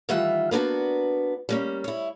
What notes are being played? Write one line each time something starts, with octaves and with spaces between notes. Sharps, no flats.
D#3 E3 G3 F4 E5 F#5
A#3 B3 D4 F#4
G3 A#3 C#4
E4 C#5